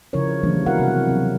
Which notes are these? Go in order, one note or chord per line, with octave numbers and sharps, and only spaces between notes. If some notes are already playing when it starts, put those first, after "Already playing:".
C#3 F3 E4 A#4 C#5
E3 F#3 G3 A#3 D4
B3 E4 F#4 A#4 F5 F#5
C3
F#3 C4